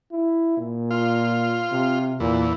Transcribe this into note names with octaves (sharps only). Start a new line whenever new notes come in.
E4
A#2
F4
C3
E2 A#2